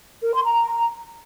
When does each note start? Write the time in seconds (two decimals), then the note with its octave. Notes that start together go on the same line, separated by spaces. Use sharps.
0.23 A#4
0.34 C6
0.45 A#5